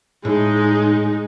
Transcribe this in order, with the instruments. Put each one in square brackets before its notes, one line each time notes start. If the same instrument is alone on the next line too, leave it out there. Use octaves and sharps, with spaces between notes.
[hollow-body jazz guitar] A2 [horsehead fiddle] G#3 D#4